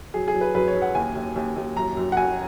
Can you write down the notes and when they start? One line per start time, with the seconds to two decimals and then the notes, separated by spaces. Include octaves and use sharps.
0.14 F#3 G#4
0.28 G#4
0.34 F#3
0.41 B4
0.54 F#2 B4
0.68 C#5
0.75 F#3
0.82 F#5
0.95 D#2 G#5
1.15 D#2
1.36 D#2
1.56 D#2
1.76 F#2 A#5
1.97 F#2
2.12 F#5
2.17 F#2 G#5